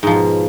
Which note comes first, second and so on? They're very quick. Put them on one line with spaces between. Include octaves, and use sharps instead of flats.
G#2 F3 B2